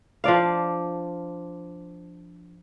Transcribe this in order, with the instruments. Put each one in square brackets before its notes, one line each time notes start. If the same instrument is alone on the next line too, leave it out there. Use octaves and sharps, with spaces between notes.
[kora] F3 D4 D5 F5